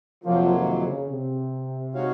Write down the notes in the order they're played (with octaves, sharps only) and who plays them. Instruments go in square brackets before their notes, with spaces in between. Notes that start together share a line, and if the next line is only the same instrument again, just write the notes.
[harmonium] F2 C3 F#3 A#3 [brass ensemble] F3
[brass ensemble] D#3
C#3
C3
[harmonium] G#3 D#4 F#4 C#5 F5